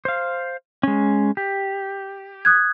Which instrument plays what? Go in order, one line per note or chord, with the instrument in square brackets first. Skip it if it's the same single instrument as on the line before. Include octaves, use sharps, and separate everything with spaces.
[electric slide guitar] C5 F5
G#3 C#4
G4
[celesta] D#6 F#6 G#6